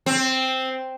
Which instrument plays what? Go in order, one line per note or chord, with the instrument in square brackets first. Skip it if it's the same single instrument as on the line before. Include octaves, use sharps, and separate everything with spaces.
[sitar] C4